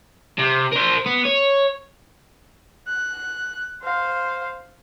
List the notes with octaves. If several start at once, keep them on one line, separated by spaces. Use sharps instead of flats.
C3
A#4 C5
B3
C#5
F#6
C5 F5